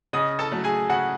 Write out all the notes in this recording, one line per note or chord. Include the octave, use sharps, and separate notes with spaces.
C#3 D#5 D#6
A4 A5
F#3 A3
G#4 G#5
C#3 F#4 F#5